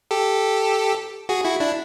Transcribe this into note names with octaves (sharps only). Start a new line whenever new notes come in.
G4 A4
F#4 G#4
E4 F#4
D4 E4